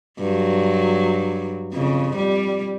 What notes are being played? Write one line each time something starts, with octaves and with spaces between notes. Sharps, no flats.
G2 F#3
F2 C#3
G3